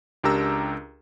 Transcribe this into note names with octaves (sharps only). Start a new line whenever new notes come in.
C#2 D4 G4 A#4 A#5 E6